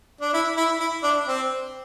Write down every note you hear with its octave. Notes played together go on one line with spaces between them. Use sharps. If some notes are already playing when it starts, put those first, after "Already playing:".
D4
E4
E4
E4
D4
C4